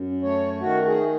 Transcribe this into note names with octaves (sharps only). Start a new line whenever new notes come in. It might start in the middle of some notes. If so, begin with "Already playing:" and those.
Already playing: F#2
A3 C#5
D#3 F#4
G#4